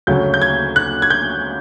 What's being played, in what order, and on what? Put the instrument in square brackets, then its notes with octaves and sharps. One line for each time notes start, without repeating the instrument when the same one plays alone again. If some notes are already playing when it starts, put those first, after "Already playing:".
[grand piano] D2 C#3 F#3 G6
G6
G#6
F#6
G#6
G6